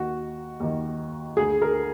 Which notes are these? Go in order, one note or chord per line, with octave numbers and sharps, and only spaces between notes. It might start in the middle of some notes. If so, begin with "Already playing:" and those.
Already playing: D#2 D#3 F#4
D#2 D#3
D2 D3 G#4
A#4